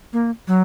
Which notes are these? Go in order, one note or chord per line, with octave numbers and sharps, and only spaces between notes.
A#3
F#3